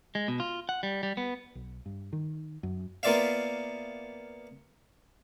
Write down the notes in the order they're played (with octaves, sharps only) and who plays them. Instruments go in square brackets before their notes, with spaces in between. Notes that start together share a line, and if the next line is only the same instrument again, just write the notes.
[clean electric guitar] G#3
B2
F4
F#5
G3
G3
B3
[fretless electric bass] B1
G2
D#3
F#2
[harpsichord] A#3 B3 F4 D5 E5 F5